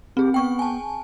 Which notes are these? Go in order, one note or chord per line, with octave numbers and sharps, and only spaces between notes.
C4 G4 G#4
B3 G5 C#6
G#5 A5